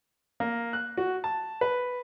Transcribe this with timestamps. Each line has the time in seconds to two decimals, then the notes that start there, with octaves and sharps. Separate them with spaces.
0.40 A#3
0.73 F#6
0.97 F#4
1.24 A5
1.61 B4